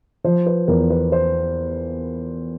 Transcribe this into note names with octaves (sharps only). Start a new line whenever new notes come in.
F3 C5
B4
E2 A#4
B4
C5